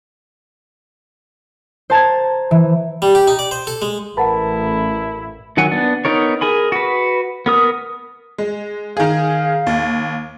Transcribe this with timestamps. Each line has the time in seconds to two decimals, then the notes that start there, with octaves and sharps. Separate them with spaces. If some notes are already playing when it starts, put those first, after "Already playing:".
1.90 C5 A5 A#5 G#6
2.51 E3
3.02 G3
3.15 G4
3.28 D#4
3.39 D5
3.51 C5
3.67 A4
3.82 G#3
4.17 A1 E4 A#4 B4 F#5 A5 B5
5.57 D#3 F#3 F#5 G#5
5.71 B3 D4
6.05 B3 D#4 A#4 C#5
6.41 G#4 A#4 G#5 B5
6.72 F#4 B4
7.46 B3 A#4 D#6
8.38 G#3
8.97 D#3 G#4 F5
9.67 D#2